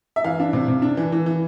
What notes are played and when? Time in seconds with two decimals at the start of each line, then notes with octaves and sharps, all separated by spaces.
0.16 E5
0.24 E3 F5
0.40 D4
0.53 C3
0.68 C3
0.82 D4
0.97 E3
1.12 E3
1.26 E3